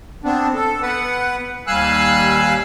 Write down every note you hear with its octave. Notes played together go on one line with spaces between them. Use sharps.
B3 C4 D4
A4
B3 B4 F#5
D#2 G3 F5 G#5 E6 F#6